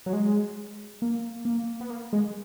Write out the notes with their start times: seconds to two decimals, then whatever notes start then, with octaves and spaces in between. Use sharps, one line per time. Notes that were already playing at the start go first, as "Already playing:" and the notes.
0.06 F#3
0.13 G#3
1.02 A#3
1.45 A#3
1.81 B3
1.90 A#3
2.13 G#3